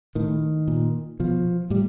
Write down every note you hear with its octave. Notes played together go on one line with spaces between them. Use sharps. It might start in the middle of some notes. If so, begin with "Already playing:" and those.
A2 D#3
A#2
B2 F3
A2 G3